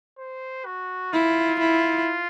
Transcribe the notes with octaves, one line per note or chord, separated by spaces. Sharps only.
C5
F#4
E4 F4
E4